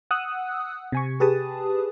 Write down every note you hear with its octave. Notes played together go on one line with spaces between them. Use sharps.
F#5 D#6 E6 F#6
C3 G#5 C#6
G4 G#4 B4 A5 D#6